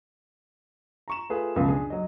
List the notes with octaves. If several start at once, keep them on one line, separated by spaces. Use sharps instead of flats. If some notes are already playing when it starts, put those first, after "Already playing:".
A#5 C#6 E7
A3 F4 G#4 B4
C#2 F#2 B2 F3
D4 G#4
F#3 D#5